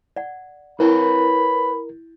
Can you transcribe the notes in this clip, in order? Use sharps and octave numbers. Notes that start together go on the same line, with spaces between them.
D5 F#5
E4 A#4 B4 C#5 G5 B5